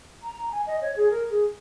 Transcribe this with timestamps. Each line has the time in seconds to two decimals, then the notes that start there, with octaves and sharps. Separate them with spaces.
0.23 A#5
0.47 A#5
0.52 G#5
0.66 D#5
0.81 C#5
0.96 G#4
1.10 A#4
1.30 G#4